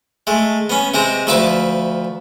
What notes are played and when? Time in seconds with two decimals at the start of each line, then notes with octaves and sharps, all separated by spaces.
0.27 G#3 A3
0.70 B3 C#4
0.94 C3 G#3 C4 A#5
1.27 D2 F3 B4 E5 C#6 D6